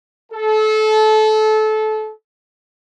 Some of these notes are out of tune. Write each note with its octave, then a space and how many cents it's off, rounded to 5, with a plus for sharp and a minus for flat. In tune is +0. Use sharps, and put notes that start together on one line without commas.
A4 -25